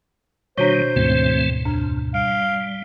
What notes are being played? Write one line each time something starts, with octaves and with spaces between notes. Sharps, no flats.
B2 D#3 G3 D4 F#4 C5 C#5 C#6
D2 G#2 B2 E3 A3 C4
F2 D4
G3 F5